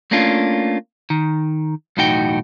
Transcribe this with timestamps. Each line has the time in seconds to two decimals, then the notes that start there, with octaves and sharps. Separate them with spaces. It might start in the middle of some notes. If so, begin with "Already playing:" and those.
0.11 A3 A#3 C#4 D4 F4
1.10 D#3
1.97 B1 E2 A2 D#4 F#4 G5